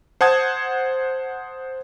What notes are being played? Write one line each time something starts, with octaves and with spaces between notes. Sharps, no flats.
C5 F#5 A5 D#6 G#6